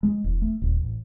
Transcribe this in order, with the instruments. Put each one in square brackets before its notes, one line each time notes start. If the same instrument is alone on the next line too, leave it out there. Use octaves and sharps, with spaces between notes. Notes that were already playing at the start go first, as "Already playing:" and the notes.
[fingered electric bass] G#3
E1
A3
D#1
A1